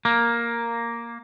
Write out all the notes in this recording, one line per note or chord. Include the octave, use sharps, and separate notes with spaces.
A#3